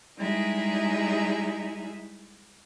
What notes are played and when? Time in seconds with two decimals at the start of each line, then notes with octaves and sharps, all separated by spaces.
0.18 G3 G#3 D#4 E4 G#4 E5